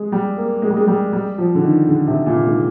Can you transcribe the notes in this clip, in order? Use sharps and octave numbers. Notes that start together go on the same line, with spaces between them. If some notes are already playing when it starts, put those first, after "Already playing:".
Already playing: G#3
G3
A#3
G#3
G3
G#3
G3
G3
F3
D3
D#3
D3
C3
A#2
G#2